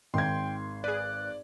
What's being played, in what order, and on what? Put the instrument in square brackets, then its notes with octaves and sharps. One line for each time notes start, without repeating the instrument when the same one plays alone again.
[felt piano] G#1 G#6 [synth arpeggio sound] D#3 [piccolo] G5 [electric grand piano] C6
[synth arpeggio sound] G#4 B4 [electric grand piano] D5 [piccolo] F#6